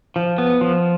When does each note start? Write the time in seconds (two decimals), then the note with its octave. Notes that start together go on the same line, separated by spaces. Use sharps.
0.16 F3
0.38 B3
0.61 F3